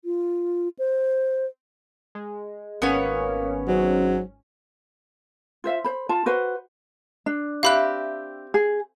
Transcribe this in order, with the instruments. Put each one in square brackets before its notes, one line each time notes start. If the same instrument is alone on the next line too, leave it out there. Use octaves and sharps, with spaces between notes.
[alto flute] F4
C5
[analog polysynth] G#3
[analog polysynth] G#1 C#4 [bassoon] A#3 [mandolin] B3 C#5
[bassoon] G#2 [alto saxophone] F#3
[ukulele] F4 C5 E5 F5
C5 B5
F4 A5
F#4 B4 C5 F#5
D4
[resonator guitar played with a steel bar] C4 G4 E5 [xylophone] F5 B5 F#6
[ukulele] G#4